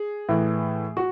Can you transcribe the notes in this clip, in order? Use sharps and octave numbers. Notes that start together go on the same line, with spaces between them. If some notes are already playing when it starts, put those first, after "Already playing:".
Already playing: G#4
A2 E3
F#4